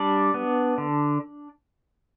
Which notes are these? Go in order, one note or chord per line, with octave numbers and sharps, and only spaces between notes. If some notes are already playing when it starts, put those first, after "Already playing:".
Already playing: G3 D4 D5
B3
D3